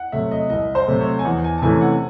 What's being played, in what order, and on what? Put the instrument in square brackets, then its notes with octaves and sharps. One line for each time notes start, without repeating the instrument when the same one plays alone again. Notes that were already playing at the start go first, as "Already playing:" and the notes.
Already playing: [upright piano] F#5
[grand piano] C3 F#3 A3 [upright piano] E5
[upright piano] D#5
[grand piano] C2 [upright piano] D#5
[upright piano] C5
[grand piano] C3 F#3 A3
[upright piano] C#5
G#5
[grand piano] E2 [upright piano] F#5
[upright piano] G#5
A5
[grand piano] C3 E3 A3 C#4 [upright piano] G#5
[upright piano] F#5